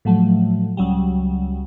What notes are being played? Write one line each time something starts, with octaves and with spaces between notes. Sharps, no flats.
A2 F3 F#3 A3
C#2 F#3 G3